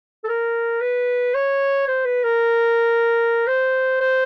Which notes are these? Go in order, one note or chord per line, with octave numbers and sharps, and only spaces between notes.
A4
A#4
B4
C#5
C5
B4
A#4
C5
C5